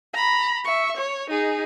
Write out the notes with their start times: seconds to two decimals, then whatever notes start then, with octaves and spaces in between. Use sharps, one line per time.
0.13 A#5 B5
0.64 E5 C#6
0.97 C#5
1.30 D#4 G#4